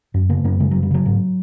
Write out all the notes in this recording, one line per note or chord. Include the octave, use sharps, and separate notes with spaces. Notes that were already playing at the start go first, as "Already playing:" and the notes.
F#2
C#3 A#3
F#2 A#3
C#3 G#3
F#3
F#2
G3
C#3 F#3
G#2